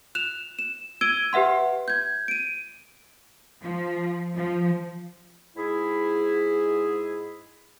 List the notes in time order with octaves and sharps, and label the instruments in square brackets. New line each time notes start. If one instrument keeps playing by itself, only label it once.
[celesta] F#6 E7 F7
E7
E6 G#6 D7 D#7 G7
G4 B4 E5 F#5 C6
G6 G#6
D7 D#7
[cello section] F3
F3
[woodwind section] G#2 E4 G#4